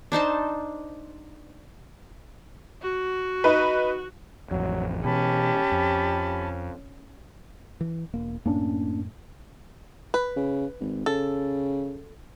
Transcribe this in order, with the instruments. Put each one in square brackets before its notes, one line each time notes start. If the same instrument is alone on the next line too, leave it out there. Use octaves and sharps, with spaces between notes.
[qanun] D4 D#4 C5 A5
[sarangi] F#4
[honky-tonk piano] D#4 B4
[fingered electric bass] A1 F2 [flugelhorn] F#3
[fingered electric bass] B2 E3 [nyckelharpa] C#4 [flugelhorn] G4 [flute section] A5 B5
[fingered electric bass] F2
[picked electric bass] E3
E1 A#3
[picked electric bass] F#2 A2 [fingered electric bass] A#3 C#4 D4
[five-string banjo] B4
[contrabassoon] C#3
G#1
[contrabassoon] C#3 [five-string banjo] A4